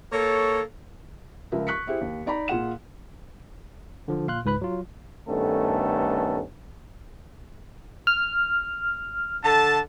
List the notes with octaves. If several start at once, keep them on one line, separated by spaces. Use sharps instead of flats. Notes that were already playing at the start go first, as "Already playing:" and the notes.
A#3 A4 C#5
C#2 F3 A#4 E5
C#6 F#6 B6 C#7
E4 G4 G#4 C5
D#2
D#4 D5 A#5 B5
A#2 F4 G#4 F#5 E7
D3 F3
A#2 F5 C6 F#6
C#2 G#2 B4 B5 F#6
F#3 F4
G2 D#3 A3 B3 C#4 A4
F6
D3 A4 A5